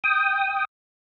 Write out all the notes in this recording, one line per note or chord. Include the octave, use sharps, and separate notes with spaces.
G5 D#6